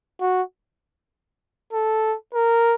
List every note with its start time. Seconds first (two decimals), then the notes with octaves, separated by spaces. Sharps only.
0.21 F#4
1.73 A4
2.34 A#4